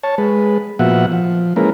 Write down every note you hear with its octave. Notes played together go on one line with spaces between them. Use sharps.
C#5 A5
G#3 B4
A#2 F3 B3 F#4 E5 F#5
F3
G#3 A#3 C#4 E4 A#4 B4